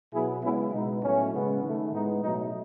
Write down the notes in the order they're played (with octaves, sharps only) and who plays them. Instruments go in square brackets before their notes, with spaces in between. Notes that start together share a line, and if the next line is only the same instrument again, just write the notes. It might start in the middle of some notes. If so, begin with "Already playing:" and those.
[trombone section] B2 F#3 B3 E4 G#4
C#3 G#3 B3 C#4 E4
B2 G#3 B3 D#4
A2 F#3 A3 C#4
C#3 G#3 B3
D#3 A3
A2 G#3 B3 D#4
B2 F#3 A3 D#4